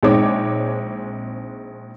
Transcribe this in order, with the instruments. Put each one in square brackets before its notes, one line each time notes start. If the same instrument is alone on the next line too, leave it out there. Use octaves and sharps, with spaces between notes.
[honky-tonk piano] A#1 G#3 C4 D#4 C#5 D6